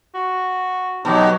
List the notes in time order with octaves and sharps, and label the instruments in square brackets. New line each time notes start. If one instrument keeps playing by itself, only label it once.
[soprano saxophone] F#4
[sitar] B2 F#3 [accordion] D#4 G4